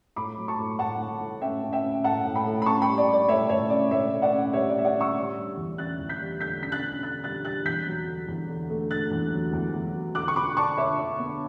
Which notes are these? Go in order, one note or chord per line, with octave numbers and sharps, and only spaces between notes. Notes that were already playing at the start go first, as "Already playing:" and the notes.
A2 B5 D6
F#3
A5 C#6
A2
A2 F#5 A5
A2
A2
C#4 E5 G5
C#4
E5 G5
C#4
A2 F#5 A5
A2
G5 B5
A2
B5
C#4 A5 C#6
G5 B5
G3
D5
G3 D5
A2 C#5 E5
A2 C#5 E5
C#4 D5
A2 C#5 E5
A2
D5 F#5
C#4
G3 C#5 E5
D5
G3 E5
D5 F#5
C#4
C#6 E6
G3
G3
E2
C#4 F#6 A6
E2
G6 B6
G3
D3 G6 B6
C#4 B6
F#6 A6
C#4
D3 F#6 A6
G3 F#6 A6
G3 F#6 A6
E2 G6 B6
F#3
D3
E2
D3
A3
D3 F#6 A6
E2
F#3
E2
E2
F#3
D3 D6 F#6
C#6
D3 B5 D6
D4 A5 C#6
D3 C#5 E5
D3
B3